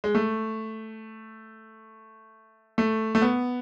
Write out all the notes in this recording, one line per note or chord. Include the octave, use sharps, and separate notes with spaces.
G#3
A3
A3
A3
B3